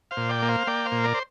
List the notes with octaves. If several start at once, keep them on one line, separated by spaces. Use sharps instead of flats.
C5 F5
A#2
D5 G5
A#3
C5 F5
A#3 D5 G5
C5 F5
A#2
A#4 D5
C5